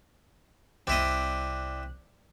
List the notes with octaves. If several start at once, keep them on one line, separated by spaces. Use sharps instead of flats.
C2 C4 E4 D5 D#5 F#6